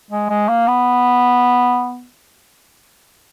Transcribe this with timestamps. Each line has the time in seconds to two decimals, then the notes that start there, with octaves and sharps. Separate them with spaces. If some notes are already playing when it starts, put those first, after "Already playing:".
0.11 G#3
0.30 G#3
0.49 A#3
0.68 B3